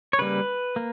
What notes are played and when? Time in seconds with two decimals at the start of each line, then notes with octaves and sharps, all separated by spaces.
0.13 C#5
0.18 C#3 G3 A#3 B4
0.76 A#3